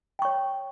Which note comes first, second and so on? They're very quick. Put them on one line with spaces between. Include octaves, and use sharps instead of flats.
G5 C#6 C#5